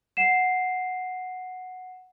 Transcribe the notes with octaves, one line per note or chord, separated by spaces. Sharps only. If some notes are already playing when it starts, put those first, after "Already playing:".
F#5 C7 E7